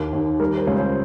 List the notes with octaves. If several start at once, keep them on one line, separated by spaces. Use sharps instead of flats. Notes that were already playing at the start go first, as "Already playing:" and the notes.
Already playing: D#2 A#4
D#2
G3 A#4
C5
C#2 C#5
C5